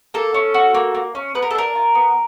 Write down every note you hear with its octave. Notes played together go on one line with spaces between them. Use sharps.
A#3 A4
C#4
F#4
A#3
A#3
C#4
B3 B4
A#4
A4
D4 A#4
F4
B3